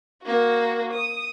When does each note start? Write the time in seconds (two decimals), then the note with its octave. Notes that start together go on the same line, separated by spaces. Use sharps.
0.23 A#3 F#4
0.93 D#6